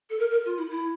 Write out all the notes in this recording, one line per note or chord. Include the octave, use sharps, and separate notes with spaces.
A4
A#4
A#4
F4
E4
E4